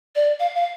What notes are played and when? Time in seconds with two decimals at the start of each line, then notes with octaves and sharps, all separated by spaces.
0.15 D5
0.39 F5
0.55 F5